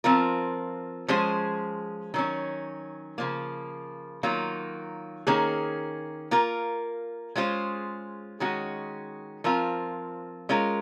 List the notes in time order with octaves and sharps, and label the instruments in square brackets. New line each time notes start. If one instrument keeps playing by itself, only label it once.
[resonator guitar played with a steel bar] F3 C4 F4 A#4
F3 G#3 C#4 G#4 C5
D#3 F#3 C#4
C#3 F3 A#3
D#3 F#3 A#3 F4
D#3 A#3 C#4 G#4
A#3 F4 A#4
G#3 C#4 F4 G#4 C5
D#3 G#3 C#4 F#4
F3 C4 F4 A#4
G#3 C#4 F4 A#4